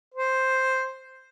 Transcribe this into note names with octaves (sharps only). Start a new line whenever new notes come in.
C5